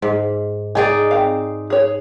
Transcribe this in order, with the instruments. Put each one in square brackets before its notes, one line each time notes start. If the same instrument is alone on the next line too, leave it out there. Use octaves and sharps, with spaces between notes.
[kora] G#2
[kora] D#4 G#4 D5 [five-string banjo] G#5
[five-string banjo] C4 F5
G#4 C#5